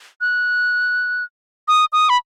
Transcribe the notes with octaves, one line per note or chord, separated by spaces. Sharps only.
F#6
D#6
D#6
B5